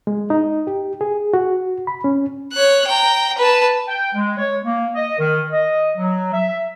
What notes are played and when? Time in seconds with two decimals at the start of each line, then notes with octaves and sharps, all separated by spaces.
0.07 G#3
0.30 D#4
0.67 G4
1.01 G#4
1.34 F#4
1.87 B5
2.04 C#4
2.53 C#5 F#6
2.87 G5 A#5
3.38 B4 A5
3.88 G5
4.15 G#3
4.38 C#5
4.64 A#3
4.95 D#5
5.18 D#3
5.52 D#5
5.97 F#3
6.33 E5